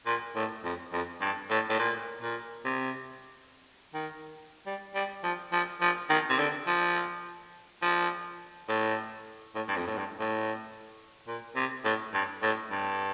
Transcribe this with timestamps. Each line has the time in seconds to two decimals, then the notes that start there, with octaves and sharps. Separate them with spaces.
0.06 A#2
0.35 A2
0.64 F2
0.93 F2
1.21 G2
1.50 A2
1.70 A2
1.79 A#2
2.22 A#2
2.65 C3
3.94 D#3
4.66 G3
4.95 G3
5.24 F3
5.52 F3
5.81 F3
6.10 D#3
6.30 C3
6.39 D3
6.67 F3
7.82 F3
8.69 A2
9.55 A2
9.68 G2
9.76 F2
9.87 A2
9.98 G2
10.20 A2
11.27 A#2
11.56 C3
11.84 A2
12.13 G2
12.42 A2
12.71 G2